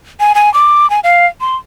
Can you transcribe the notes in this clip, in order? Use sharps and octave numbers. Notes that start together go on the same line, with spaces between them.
G#5
G#5
D6
G#5
F5
C6